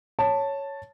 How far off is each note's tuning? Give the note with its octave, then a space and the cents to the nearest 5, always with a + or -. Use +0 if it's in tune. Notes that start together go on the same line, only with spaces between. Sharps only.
C#5 +0 A5 +5